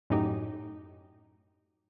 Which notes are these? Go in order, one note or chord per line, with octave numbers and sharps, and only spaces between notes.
F#2 A2 D#4 G4